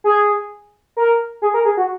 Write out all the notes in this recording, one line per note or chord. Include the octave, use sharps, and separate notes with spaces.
G#4
A#4
G#4
A#4
G#4
F#4